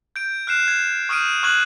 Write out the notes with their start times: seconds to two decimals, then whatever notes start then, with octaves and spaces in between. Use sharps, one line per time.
0.16 G6 D7
0.47 F6 F#6 C7 E7
0.68 G#6
1.09 C#6 D#6 F6 G6 D7 D#7
1.43 C#6 F6 F#6 G#6 F#7